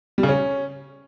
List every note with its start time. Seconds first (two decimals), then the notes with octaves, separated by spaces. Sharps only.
0.18 G3
0.23 C#3
0.29 C#4